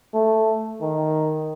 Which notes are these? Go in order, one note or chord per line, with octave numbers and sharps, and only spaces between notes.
A3
D#3